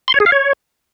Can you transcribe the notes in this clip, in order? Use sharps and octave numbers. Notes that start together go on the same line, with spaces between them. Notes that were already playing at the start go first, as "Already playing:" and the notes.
C6
C#5
G#4
F5
C#5